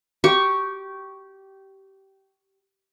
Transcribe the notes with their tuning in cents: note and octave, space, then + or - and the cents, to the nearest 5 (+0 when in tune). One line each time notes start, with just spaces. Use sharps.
G4 -20 C#6 +0